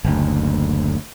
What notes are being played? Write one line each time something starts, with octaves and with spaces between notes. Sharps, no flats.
F#1 D2